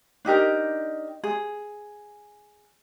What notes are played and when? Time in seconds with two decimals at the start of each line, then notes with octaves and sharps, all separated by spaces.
0.25 D4 D#4 G4 A#4
1.24 G#4